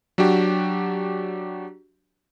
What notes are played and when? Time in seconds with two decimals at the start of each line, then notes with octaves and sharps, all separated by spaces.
0.18 F#3 D4 F#4 G4